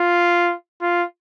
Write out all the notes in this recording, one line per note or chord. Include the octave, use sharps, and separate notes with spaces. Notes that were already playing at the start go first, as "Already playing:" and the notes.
Already playing: F4
F4